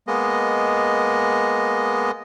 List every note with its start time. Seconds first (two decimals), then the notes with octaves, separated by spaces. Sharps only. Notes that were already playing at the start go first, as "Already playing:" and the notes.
0.07 G#3 A#3 B3 D#5